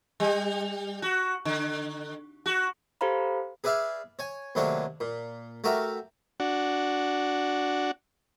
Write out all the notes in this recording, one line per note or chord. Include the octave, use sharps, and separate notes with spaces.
G3
F#4
D3
F#4
G4 A4 C5 F5 A#5 B5
G#4 B4 D5 E5 F5
C#5 G#5
D#2 C3 F#3 A3 D4 C#5
A#2
A3 F#4 G4 A#4 E5
D4 F#4